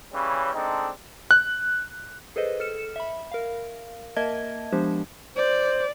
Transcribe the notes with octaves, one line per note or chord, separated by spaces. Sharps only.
C#3 E3 G3 C#4
G#3 C4 D4 D#4 A4
F#6
G#4 A4 B4 C5 D#5
A4 F6 C#7 E7
E5 B5
A#4 F5
A#3 A#4 D#5 E5 A5 G#6
F3 G#3 B3 D4 G4 C5
C5 D5